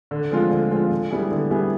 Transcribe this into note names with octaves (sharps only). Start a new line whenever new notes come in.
D3
F3 G#3 C4 F4
D3
F3 G#3 C4 F4
D3
G3 B3 E4 G#4
D3
G3 B3 E4 G#4